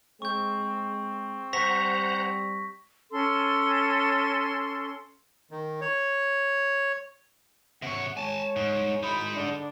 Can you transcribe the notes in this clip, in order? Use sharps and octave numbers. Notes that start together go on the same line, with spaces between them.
G#3 C4 C#6 G6
G3 C5 F#5 A#5 C#6 A#6 B6
C#4 A4 C6
D#3
C#5
C3 C#5 F#5
G#3 C#5 G#5 A5
G#2
G#1 G#3 D#4 E4 B5
D3 D4